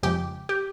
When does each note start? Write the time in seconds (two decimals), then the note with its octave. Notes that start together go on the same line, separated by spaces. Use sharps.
0.03 F2 C#3 F3 G#3 G4
0.49 G4